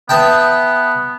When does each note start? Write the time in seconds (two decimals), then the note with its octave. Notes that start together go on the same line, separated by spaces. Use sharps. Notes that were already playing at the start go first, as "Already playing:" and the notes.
0.09 B3 B4 E5 G5 A5 D#6